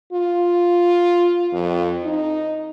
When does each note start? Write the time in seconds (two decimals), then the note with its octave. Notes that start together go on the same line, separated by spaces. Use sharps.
0.13 F4
1.53 F2
2.03 D#4